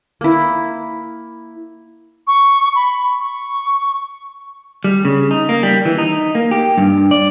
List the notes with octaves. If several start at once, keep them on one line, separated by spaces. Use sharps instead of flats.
A#3 E4
C#6
B5
C#6
G3
C#3
D#4
A#3
G3
E3
D#4
A#3
G4
G2
D5